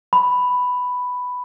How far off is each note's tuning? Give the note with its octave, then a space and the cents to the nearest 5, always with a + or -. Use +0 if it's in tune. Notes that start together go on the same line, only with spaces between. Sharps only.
B5 +5